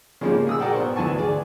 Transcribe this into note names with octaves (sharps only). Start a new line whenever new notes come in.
C#3 F3 G3 G#3 A#3
G#4 D#6 E6
F#4 G#4 A#4 D5 F#5 G5
B3 C5 C#6
D2 E3 B4 G#5 A5 C#6
G#4 D5